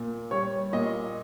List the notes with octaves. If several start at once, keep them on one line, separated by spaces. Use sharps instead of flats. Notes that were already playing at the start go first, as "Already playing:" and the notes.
Already playing: A#2
G3 C#5
A#2 D#5